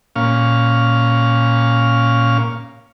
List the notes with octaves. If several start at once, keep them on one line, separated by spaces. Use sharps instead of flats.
A#2 C#4 F5